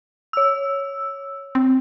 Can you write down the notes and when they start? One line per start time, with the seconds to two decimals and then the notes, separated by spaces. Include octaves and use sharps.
0.33 C#5 E6
1.55 C4